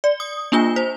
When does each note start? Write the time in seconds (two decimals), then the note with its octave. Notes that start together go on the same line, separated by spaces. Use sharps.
0.04 D5
0.20 D#6
0.52 A#3 D4 F4 G#5
0.76 C5